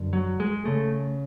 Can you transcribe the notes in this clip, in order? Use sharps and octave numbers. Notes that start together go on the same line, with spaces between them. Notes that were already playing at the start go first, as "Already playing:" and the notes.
Already playing: F#2 D3
F#3
G#3
C#3 A3